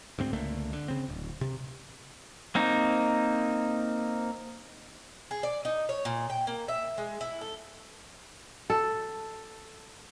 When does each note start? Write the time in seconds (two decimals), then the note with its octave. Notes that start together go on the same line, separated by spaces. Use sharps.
0.19 D2 G#2 C4
0.33 C#2 D3 A3 A#3
0.73 D3
0.88 C#3 C4
1.09 D1
1.41 C3
2.55 A#3 C4 D#4
5.31 G#4
5.43 D5
5.65 D#4
5.89 C#5
6.05 A#2
6.30 G5
6.47 A#3
6.68 E5
6.98 G#3
7.21 E4
7.41 A4
8.70 A4